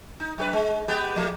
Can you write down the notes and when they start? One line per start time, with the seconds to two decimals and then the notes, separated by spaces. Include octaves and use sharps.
0.20 D#4
0.38 F#2 G4 B4
0.53 G#3
0.88 G#3 B3 G4
1.16 F3 A3 A#3